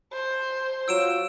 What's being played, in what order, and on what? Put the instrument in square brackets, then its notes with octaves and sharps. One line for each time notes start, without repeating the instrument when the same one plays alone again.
[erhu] C5
[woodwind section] F#3 [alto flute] F4 [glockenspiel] E6 D7 E7